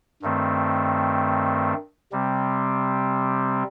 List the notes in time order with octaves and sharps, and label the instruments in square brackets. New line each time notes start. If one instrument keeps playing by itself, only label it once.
[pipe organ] G2 D#3 A3 C4
C3 G3 C4